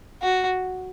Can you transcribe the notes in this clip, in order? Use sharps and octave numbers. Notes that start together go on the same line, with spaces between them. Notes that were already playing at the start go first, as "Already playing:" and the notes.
F#4